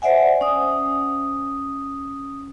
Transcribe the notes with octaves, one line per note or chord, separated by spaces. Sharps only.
C5 D5 E5 F#5 G#5
C#4 D#6